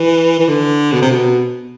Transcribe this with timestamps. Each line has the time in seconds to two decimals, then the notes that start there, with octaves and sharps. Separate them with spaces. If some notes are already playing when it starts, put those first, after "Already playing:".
Already playing: E3
0.40 E3
0.48 D3
0.92 B2
1.02 C3
1.11 B2